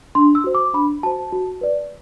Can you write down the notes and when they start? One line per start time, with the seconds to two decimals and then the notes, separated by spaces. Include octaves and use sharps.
0.15 D4 C6
0.35 E6
0.44 F#4 C5
0.55 D6
0.74 D4 B5
1.03 F#4 C5 A5
1.32 F#4
1.61 B4 D5